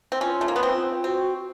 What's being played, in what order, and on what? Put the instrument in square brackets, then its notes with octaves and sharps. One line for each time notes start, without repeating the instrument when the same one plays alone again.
[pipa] C4
[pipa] C#4 [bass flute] F4
[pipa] A3
A#3
B3
C4
[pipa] C4 [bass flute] F#4